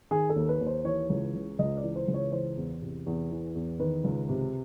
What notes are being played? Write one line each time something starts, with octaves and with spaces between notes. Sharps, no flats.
D#3 G#4
A4
D#2
B4
D#2
C5
E3 C#5
C#2
C#3
C#2 D#5
D5
E3
C5
C#2
C#5
E3 C5
E2
C3
E2
E3
E2
D#3 B4
C#2
C3